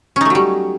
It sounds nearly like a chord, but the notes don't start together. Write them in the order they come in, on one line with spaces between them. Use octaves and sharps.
C#4 D#4 A3 F#3 G3